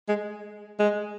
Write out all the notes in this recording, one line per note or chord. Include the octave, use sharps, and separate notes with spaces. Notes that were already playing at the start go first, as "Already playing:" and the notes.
G#3
G#3